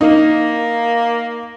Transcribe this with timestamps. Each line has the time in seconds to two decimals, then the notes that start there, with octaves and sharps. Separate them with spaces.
0.01 A#3 D#4